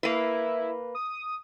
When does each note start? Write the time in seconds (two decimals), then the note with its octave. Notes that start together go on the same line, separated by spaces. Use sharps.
0.03 A#3 E4 B4
0.95 D#6